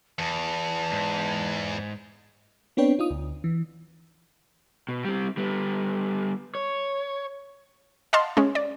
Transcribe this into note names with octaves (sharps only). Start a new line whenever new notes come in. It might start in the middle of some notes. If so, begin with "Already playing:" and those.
E2 A5
G#2
B3 C4 D4 B4 C#5 G5
D#4 F4 D#6
D2
E3
B2
G3 C4
G3 B3
C#5
D#5 F5 F#5 A5 C6
G#3 C#4
D5